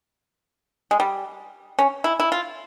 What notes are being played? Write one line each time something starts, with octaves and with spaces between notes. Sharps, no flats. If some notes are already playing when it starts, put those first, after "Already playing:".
G#3
G3
C#4
E4
E4
F4